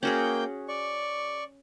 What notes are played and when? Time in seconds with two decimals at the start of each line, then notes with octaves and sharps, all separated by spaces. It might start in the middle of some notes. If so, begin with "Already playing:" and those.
0.03 A#3 C#4 F#4 G#4 G5 G6
0.68 D5 C#6